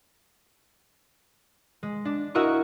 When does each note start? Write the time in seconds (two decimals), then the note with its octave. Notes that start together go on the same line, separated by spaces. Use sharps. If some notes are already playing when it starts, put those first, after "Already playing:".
1.83 G#3
2.05 D4
2.35 E4 F#4 A#4 D#5 C#6